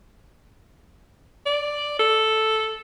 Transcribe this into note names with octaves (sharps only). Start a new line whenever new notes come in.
D5
A4